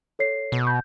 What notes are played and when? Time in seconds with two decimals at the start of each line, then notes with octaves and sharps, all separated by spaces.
0.19 A4 C#5 C7
0.52 B2
0.67 G6